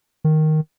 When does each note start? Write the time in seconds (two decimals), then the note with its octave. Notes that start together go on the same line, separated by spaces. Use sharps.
0.24 D#3